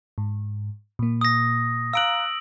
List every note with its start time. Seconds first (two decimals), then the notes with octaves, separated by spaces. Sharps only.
0.18 G#2
0.99 A#2 A#3
1.21 D#6 A#6
1.93 F5 A#5 E6 F#6 D7 F#7